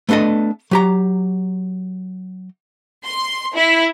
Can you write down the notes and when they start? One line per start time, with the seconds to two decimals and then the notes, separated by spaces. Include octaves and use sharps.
0.09 A3 B3 D4 A4 D#5
0.71 F#3 G4 A#5
3.04 C6
3.54 E4